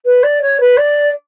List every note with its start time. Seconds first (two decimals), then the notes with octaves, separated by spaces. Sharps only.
0.05 B4
0.23 D5
0.42 C#5
0.60 B4
0.77 D5